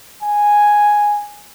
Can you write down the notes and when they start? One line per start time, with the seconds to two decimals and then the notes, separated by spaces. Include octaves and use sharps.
0.23 G#5